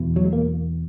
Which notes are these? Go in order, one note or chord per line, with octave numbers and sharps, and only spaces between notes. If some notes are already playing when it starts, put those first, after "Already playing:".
Already playing: E2 B2
F#3
G#3
A#3